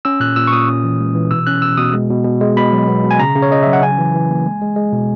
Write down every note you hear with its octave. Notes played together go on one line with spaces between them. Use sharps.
C#4 E6
A#2 F#6
A#2 E6
C#6
A#2 D#6
C#4
E3
G#3
E3
B2 E6
C#4 F#6
B2 E6
B2 D#6
G#3
B2
B2
G#3
B2 B5
F#3
B3
B2
G#5
C#3 A#5
C#3
C#5
C#3 D#5
F#3 E5
F#5
C#4 G#5
E3
E3
A#3
G#3
G#3
G#3
B2